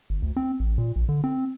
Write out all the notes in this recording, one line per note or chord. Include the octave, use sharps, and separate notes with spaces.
G1
D2
C4
A1
A#2
A#1
D3
C4